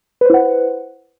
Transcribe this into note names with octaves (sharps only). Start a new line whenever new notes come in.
E4 B4 C5 F#5